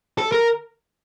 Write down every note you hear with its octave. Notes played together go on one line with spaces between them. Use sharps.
A4
A#4